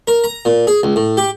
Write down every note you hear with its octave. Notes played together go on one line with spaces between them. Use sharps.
A#4
A#5
A#2
G#4
C#2
A2
G4